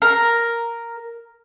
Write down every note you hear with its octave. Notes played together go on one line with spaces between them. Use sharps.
A#4